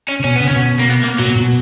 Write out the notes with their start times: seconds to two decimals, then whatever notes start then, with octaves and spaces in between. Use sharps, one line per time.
0.09 C#4
0.20 C#3
0.24 B2 C#4
0.36 C#3 B3
0.47 C#3 C#4
0.56 B2
0.79 A#3
0.88 B3
1.03 A#3
1.19 A#2 F#3
1.29 B2
1.36 A#2
1.40 B2